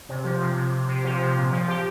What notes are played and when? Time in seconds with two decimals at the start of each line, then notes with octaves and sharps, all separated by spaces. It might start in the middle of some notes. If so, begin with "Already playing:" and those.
0.09 C3
0.24 F3
0.41 C3
0.56 C3
0.72 C3
0.88 C3
1.04 F3
1.21 C3
1.36 A#2
1.52 F3
1.68 G4